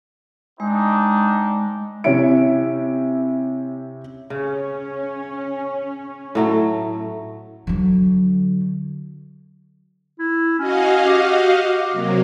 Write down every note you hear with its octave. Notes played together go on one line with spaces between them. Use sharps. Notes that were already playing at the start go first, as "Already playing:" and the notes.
G#3 C4 D4 D#4
C3 C#4 E4 E5 D7
C#3 C#4
A2 F#3 A3
D3 F#3
E4
C#4 F#4 D#5 F5
G4
C3 F#3 A#3